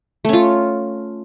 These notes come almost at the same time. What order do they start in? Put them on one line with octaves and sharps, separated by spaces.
A3 C#4 F4